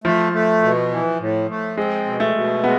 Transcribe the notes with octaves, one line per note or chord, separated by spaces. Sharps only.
F3 A3
A3
B2
E3
A2
A3
G#3 C4
B2
A3
B2
G#3 B3